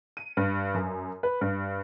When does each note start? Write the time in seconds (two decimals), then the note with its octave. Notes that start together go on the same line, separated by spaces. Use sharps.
0.17 D#7
0.37 G2
0.74 F#2
1.23 B4
1.41 G2